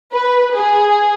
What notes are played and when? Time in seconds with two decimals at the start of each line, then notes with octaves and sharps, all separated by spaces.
0.13 B4
0.55 G#4